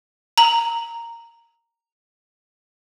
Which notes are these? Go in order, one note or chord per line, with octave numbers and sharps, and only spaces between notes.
A#5 F#7